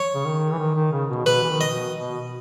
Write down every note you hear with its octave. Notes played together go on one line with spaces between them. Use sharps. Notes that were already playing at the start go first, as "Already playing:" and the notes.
Already playing: C#5
C#3
D#3
E3
D#3
D#3
C#3
B2
B2 B4
E3
D#3
D#5
B2
B2